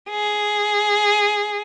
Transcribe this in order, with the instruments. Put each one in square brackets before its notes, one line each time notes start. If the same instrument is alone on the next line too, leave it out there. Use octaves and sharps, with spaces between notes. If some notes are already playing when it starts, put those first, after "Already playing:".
[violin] G#4